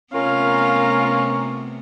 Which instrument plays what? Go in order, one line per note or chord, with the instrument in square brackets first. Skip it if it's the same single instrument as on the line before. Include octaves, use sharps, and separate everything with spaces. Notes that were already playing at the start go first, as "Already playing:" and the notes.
[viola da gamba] C3 A3 B3 [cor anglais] C#4 [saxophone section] F4 A#4 [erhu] F5